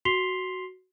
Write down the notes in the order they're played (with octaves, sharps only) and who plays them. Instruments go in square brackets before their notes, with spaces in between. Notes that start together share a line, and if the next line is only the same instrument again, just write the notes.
[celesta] F#4 C6 B6 C7 F7 G7